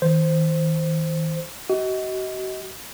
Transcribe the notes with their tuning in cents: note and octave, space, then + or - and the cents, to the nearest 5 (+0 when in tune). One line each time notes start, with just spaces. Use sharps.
D#3 +45 C5 +0
F#4 +35 D#5 +30